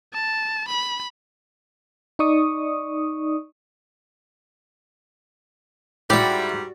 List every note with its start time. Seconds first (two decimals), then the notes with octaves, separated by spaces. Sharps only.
0.13 A5
0.68 B5
2.19 D#4 D5 C#6 D#6
6.10 G#2 G3 E4 F#4 G4 D5 G5